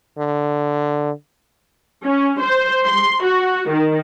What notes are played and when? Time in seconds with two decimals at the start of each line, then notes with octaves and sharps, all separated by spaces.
0.18 D3
2.05 C#4
2.41 C5
2.85 C6
3.23 F#4
3.69 D#3